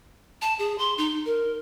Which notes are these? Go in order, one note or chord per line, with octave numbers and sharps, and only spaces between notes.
A5
G#4
C6
D#4
A#4